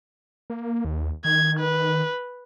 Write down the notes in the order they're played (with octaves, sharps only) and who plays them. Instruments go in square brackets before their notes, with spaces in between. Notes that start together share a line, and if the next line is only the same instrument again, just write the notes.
[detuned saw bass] A#3
D#2
[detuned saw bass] D#3 [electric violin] G#6
[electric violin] B4